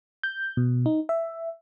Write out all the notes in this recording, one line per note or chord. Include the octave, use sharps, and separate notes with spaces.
G6
B2
D#4
E5